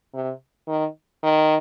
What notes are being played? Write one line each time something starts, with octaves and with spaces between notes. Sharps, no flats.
C3
D#3
D#3